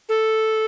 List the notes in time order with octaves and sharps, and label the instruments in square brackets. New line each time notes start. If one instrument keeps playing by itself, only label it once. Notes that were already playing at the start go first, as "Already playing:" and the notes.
[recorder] A4